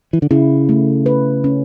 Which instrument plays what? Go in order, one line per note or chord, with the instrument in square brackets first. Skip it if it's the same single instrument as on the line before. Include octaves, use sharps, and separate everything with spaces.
[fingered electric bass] E3
D3
[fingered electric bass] C#3 [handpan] E4
[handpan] A3
B4
C#4